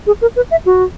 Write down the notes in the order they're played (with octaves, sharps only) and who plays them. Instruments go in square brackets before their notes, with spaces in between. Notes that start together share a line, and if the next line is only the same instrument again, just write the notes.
[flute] G#4
A#4
B4
E5
F#4